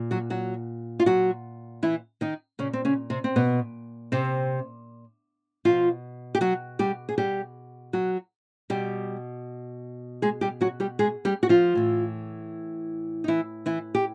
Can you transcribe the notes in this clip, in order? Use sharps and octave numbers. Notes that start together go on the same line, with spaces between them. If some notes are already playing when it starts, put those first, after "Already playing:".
Already playing: A#2
F#3 F#4
F#3 F#4
F4
F#3 F#4
E3 E4
D#3 D#4
A#2 C#3 C#4
C4
C#3 C#4
C3 C4
C4
B2 B3
C3 C4
B2 F3 F4
G4
F#3 F#4
G3 G4
G#4
G3 G4
F#3 F#4
B2 G3 G4
G#3 G#4
G3 G4
F#3 F#4
G3 G4
G#3 G#4
G3 G4
F#4
F3 F4
A2 E3
D#4
E3 E4
E3 E4
G4